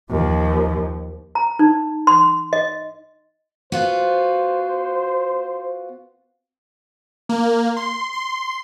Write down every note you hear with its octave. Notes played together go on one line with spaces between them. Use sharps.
D#2 F3
A#5
D#4
C6
D#5
B3 F4 F#4 C5
A#3
C6
C6